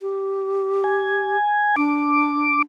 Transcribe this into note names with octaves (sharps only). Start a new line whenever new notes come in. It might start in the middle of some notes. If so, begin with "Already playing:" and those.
G4
G#5
D4 D6